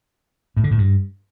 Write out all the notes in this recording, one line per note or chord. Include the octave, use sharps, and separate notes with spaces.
A2
D3
A2
G2